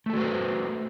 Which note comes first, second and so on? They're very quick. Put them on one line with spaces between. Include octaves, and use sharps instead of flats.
A3 A4 F#4 B4 C5